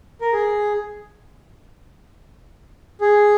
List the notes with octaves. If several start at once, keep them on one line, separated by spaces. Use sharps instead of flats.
A#4
G#4
G#4